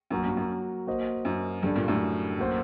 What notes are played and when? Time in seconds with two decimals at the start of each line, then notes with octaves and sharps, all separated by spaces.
0.10 F#2 F#3 A#3 F#4 A#4
0.24 G2
0.37 F#2
0.87 A#3 F#4 C5 D#5
1.25 F#2
1.63 G2 D3 G3 D4 A4 D5
1.76 G2 A#2
1.88 F#2 A2
2.39 F#3 A#3 F#4 C5